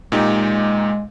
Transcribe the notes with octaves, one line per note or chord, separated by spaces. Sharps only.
A#2 G#3 D#4 G4